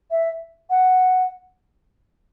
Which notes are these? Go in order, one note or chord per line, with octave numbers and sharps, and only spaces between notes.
E5
F#5